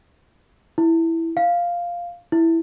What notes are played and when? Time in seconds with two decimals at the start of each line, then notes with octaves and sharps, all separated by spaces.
0.78 E4
1.37 F5
2.32 E4